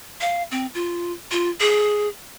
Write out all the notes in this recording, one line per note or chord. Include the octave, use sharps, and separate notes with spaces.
F5
C4
F4
F4
G#4